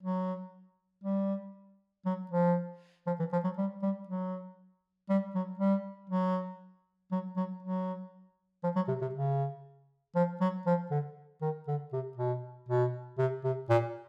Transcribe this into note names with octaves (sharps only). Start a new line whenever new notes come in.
F#3
G3
F#3
F3
F3
E3
F3
F#3
G3
G3
F#3
G3
F#3
G3
F#3
F#3
F#3
F#3
F3
F#3
C3
C3
C#3
F3
F#3
F3
D3
D#3
D3
C3
B2
B2
C3
C3
A#2